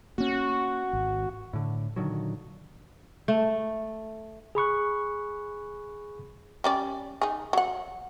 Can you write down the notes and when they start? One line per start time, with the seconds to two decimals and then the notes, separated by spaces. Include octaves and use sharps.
0.18 A#3 C#4 F#4
0.93 G#1
1.53 A2 D3
1.96 A#2 D3 D#3 F#3
3.28 A3
4.55 G#4 B5 C#6 F#6
6.64 G3 C#4 D5
7.22 D#4 G#4
7.53 F#3 F#5